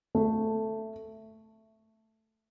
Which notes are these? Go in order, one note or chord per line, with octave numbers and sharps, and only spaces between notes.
A3